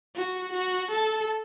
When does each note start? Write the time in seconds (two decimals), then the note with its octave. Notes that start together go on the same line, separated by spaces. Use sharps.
0.16 F#4
0.52 F#4
0.91 A4